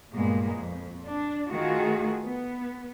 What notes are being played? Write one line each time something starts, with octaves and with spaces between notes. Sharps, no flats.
G2 A#2 G#3 A#3 B3
F2
D4
D#3 A3 F4 F#4 G#4
B3